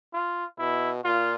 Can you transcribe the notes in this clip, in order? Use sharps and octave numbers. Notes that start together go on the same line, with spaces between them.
F4
B2 E4
A#2 F4